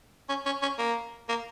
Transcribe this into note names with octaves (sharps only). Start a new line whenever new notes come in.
C#4
C#4
C#4
A#3
A#3